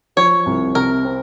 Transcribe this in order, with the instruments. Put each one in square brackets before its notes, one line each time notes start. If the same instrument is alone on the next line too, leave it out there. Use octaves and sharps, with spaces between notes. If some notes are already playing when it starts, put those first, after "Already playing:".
[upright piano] F3 [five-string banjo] C#5
[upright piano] C2
[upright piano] C3 [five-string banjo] A#4
[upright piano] C4